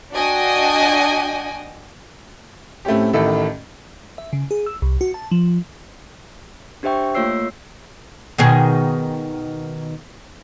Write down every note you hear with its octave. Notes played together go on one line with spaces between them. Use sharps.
D4 F#4 D#5 G5 G#5
A2 A3 C4 C#4 G4
A1 A2 D#3 A4 E5
E5
C#3
G#4
E6
C2
F#4
A5
F3
D4 G4 C5 E5 G5 C#6
A3 A#3 F4 C#5 E6 C7
B2 D#3 G#4